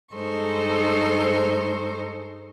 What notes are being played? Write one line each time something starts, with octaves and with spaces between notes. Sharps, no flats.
G2 G#3 D#4 A4 C5 C#6